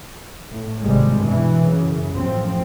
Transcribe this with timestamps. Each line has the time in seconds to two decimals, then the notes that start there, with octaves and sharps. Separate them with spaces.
0.51 A2
0.83 G#1 C3 G3 G#3
1.18 G2 B2 E3
1.68 F#2 C#3
2.18 A1 F#2 F3 C4